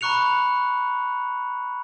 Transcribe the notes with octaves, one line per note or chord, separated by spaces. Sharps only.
A#5 B5 C#6 F#6 C#7 F7